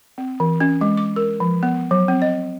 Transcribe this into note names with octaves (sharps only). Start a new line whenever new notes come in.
C4
E3
C#4
G#3
D6
A#4
F3
B3
F#3
C4
D#5